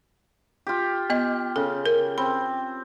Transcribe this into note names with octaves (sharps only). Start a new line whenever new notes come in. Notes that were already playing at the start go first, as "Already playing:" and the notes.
F4 G4
B3 D#5
C#3 A4
A#4
C4 B5